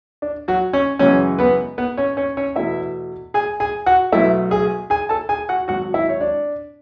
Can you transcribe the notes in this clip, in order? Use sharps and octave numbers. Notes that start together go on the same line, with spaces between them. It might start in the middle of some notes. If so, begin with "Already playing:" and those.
D4
F#3 F#4
C#4 C#5
F#2 C#3 E3 G#3 C#4 C#5
B3 B4
B3 B4
C#4 C#5
C#4 C#5
C#4 C#5
E2 B2 A3 E4 E5
G#4 G#5
G#4 G#5
F#4 F#5
B1 B2 A3 E4 E5
G#4 G#5
G#4 G#5
A4 A5
G#4 G#5
F#4 F#5
G#1 G#2 F#3 F#4 F#5
E4 E5
C#5
D4 D5